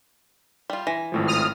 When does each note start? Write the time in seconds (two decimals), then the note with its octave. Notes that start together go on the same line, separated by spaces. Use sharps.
0.70 G3 F4
0.87 E3 A#6 B6
1.12 G#1 A2 F3
1.27 D#6 F6